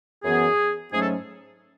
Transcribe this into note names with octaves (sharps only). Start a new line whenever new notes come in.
F#2 E3 B3 G#4
G#2 F#3 A3 C#4 G#4
A4